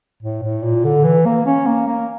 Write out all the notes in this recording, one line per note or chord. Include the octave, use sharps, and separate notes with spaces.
A2
A2
A#2
D3
E3
A#3
C#4
A#3
A#3